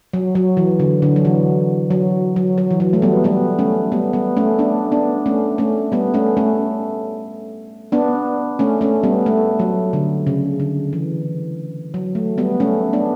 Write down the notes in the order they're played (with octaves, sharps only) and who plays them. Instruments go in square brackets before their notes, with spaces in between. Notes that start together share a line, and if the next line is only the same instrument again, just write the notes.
[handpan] F#3
F#3
E3
D3
D3
F#3
E3
F#3
F#3
F#3
E3
F#3
A3
G3 B3
G3 B3
A3 C#4
G3 B3
G3 B3
A3 C#4
B3 D4
B3 D4
A3 C#4
A3 C#4
G3 B3
A3 C#4
A3 C#4
B3 D4
A3 C#4
A3 C#4
G3 B3
A3
F#3
D3
C#3
D3
E3
F#3
A3
G3 B3
A3 C#4
B3 D4